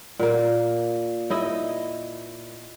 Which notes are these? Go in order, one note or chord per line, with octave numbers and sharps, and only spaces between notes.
A#2 A#3
D#4 E4 D#5